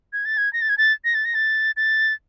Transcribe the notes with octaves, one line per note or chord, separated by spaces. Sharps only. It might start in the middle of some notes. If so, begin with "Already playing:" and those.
G#6
A6
G#6
A#6
A6
G#6
A6
A#6
A6
A#6
A6
A6